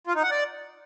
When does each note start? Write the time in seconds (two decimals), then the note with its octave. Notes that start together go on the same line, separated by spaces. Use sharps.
0.07 F4
0.15 D#4
0.23 F#5
0.31 D5